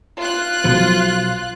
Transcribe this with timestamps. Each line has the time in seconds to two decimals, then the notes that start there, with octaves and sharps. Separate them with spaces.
0.19 F4 F#6
0.64 B1 B2 F3